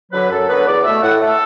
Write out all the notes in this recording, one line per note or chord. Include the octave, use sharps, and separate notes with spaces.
D3 F#3 B4
F#2 A4
D3 F#3 B3 B4
E2 D5
B2 A3 E5
A2 F#5
A3
A4